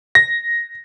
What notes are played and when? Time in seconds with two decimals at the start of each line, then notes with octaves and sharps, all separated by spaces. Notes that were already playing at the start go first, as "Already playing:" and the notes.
0.15 A#6